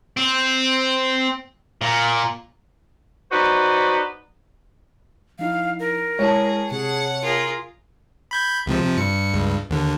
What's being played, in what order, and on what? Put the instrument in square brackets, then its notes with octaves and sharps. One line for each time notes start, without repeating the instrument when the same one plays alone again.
[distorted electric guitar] C4
A#2
[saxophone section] D#4 F#4 B4 C5 D5
[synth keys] F3 D#4 E4 [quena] F5
[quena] A#4
[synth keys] G#3 E4 [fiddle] G#4 [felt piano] C#5 A5
[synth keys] C3 C#7 [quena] G#4 [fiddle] F#5
[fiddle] F4 G#4 [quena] A#4
[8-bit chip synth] B5 G6 G#6
C#2 C3 F3
C3 F3
G2 C#7
C#2 G2
D#2 D3